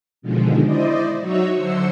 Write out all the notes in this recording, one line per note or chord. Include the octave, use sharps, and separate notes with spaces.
B2 D3 D#3 F3 G#3
E4 C5 D5 D#5
F#3 D#4 F#4 C#5 E5
D3 F#3 C5 E6 C#7